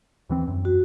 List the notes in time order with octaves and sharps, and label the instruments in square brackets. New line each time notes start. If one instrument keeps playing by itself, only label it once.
[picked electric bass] D#2 E3 C4
F#2
[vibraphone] F#4